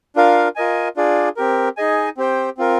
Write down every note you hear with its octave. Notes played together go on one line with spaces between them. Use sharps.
D4 F4 A#4 F5
F4 A#4 D#5 G#5
D4 F4 G#4 D5
C4 G4 A#4
D#4 G#4 D#5 G#5
C4 G4 C5 G5
C4 F4 A#4